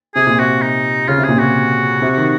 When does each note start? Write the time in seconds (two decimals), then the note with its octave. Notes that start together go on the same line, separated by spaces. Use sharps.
0.15 C3 G#4
0.27 A#2
0.39 C3 F#4
0.62 D#4
1.08 C#3 F4
1.18 C3
1.24 A#2 G#4
1.38 C3 F#4
2.02 C3
2.17 D#3